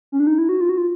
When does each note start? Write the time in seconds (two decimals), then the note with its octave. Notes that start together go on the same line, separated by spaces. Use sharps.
0.12 C#4
0.20 D4
0.27 D#4
0.38 E4
0.49 F#4
0.61 F4
0.69 F#4
0.78 F4